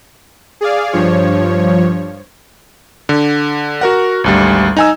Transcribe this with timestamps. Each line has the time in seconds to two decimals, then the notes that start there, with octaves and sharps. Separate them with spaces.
0.61 G#4 D5 F5
0.93 G2 F3 C#5
3.09 D3
3.81 F#4 A#4 F#5
4.24 G#1 D2 G3
4.77 D#4 G#5 E6